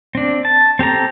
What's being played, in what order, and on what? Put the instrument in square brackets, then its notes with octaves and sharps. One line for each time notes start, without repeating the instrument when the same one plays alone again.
[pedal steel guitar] C4 D4
A5
C4 G4 A4 A#5